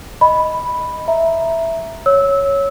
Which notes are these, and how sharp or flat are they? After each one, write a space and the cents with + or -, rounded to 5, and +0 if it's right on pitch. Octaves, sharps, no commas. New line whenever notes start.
D#5 +0 B5 +0
E5 +0 A#5 +0
C#5 +0 E6 -20